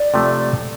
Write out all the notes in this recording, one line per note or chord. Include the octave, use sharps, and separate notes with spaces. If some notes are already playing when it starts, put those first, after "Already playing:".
Already playing: D5
C3 F3 A3